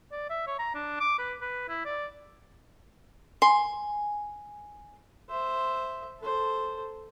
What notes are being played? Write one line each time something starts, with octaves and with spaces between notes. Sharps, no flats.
D5
E5
C#5
A#5
D4
D6
B4
B4
E4
D5
G#5 C6
C5 E5
A4 C5